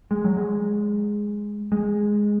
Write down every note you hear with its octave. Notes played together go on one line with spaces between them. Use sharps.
G#3
F#3
G#3
G#3